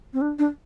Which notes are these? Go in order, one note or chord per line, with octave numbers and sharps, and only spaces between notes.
C4
D4
D4